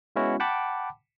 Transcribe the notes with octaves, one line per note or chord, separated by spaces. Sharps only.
G#3 B3 C#4 E4 F#4
F#5 G5 A5 B5 D6